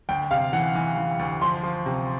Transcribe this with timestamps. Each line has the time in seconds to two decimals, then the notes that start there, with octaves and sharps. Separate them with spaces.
0.09 D2 G5
0.31 C3 F5
0.53 E3 F#5
0.75 E3
0.97 E3
1.19 D2
1.41 F3 C6
1.63 F3
1.86 C3